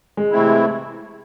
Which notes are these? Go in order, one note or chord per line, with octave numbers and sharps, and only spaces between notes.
G#3
C3 E3 A3 C4 E4